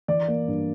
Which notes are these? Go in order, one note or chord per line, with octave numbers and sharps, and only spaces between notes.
E3 D5
A#3
G2